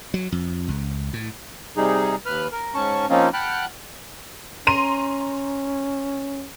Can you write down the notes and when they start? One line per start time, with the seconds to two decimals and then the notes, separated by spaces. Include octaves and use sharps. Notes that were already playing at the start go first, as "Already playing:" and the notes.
0.14 F#3
0.32 F2
0.68 C#2
1.13 A2
1.77 C3 G3 D#4 G#4
2.26 D#2 B4 B5 F6
2.52 A#4
2.75 G#2 C#4 A5 C#6
3.10 F3 A#3 C4 C#4 D#4 F4
3.33 F#5 G5 A5 B5 F6 F#6
4.67 C#4 A#5 C6 D#7